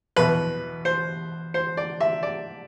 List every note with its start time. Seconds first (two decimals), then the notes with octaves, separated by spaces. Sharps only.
0.16 E2 B2 B4
0.85 C5
1.54 C5
1.77 D5
2.00 E5
2.23 D5